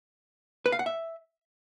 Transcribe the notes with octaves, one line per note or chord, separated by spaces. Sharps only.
B4
F5
F#5
E5